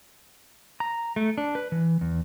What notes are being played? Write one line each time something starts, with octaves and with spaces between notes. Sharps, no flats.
A#5
A3
D4
B4
E3
E2